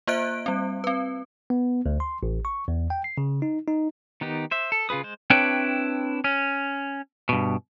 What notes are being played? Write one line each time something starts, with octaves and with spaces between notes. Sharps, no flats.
A#3 F4 C5 E5 F#6 D7
G3 C4
C4 B4
B3
D2
C6
A1
C#6
E2
G5
C7
C#3
D#4
D#4
D#3 B3 D#4 G4
C5 E5
A4
C#3 F4 G#4 B4 D#6
G#3 C5
C4 D4 E4 B4 C#5 G5
C#4
G2 B2